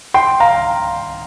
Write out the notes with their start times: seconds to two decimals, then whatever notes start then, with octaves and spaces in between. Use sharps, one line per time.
0.14 G5 C6
0.40 F5 A#5